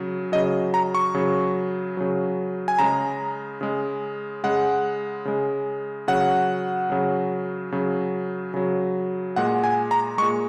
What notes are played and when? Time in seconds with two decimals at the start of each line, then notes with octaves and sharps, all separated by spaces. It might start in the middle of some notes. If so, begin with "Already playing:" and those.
Already playing: C#3 F#3
0.32 C#3 F#3 D#5
0.74 A#5
0.95 C#6
1.14 C#3 F#3
1.97 C#3 F#3
2.68 G#5
2.79 C#3 G#3 A#5
3.61 C#3 G#3
4.43 C#3 G#3 F#5
5.25 C#3 G#3
6.08 C#3 F#3 F#5
6.90 C#3 F#3
7.72 C#3 F#3
8.54 C#3 F#3
9.36 A#2 G#3 F#5
9.64 G#5
9.91 A#5
10.18 G#3 C#6
10.22 A#2